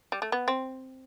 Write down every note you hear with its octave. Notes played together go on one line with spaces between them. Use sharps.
G3
A3
B3
C4